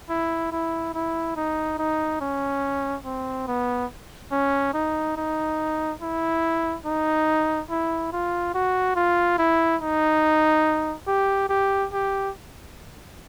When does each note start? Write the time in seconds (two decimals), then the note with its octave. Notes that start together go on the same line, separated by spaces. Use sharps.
0.10 E4
0.52 E4
0.95 E4
1.36 D#4
1.79 D#4
2.21 C#4
3.05 C4
3.48 B3
4.32 C#4
4.74 D#4
5.17 D#4
6.01 E4
6.86 D#4
7.70 E4
8.13 F4
8.54 F#4
8.96 F4
9.38 E4
9.81 D#4
11.07 G4
11.49 G4
11.93 G4